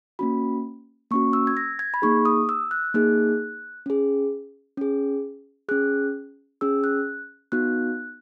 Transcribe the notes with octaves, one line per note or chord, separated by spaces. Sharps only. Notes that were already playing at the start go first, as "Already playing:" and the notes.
A#3 C#4 F#4 B5
A#3 C#4 F#4 C#6
E6
G#6
A#6
G#6
B5
A#3 D#4 G#4 C#6
D#6
E6
F#6
A#3 D#4 G#4 F#6
C#4 G#4
C#4 G#4
C#4 G#4 F#6
C#4 G#4 E6
F#6
B3 D#4 F#4 F#6